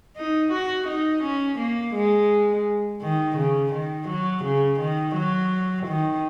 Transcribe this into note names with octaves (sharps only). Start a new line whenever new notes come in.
D#4
F#4
D#4
C#4
A#3
G#3
D#3
C#3
D#3
F#3
C#3
D#3
F#3
D#3